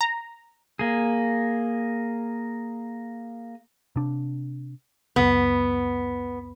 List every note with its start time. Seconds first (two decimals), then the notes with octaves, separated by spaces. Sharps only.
0.01 A#5
0.79 A#3 G#4
3.96 C3 D4
5.16 C#2 F#2 B3